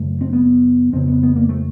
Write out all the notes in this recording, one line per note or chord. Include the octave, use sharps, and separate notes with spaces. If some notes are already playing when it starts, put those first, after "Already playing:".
Already playing: F#2 C#3 A3
C4
B3
F2 C#3 C4
B3
B3
A#3
A3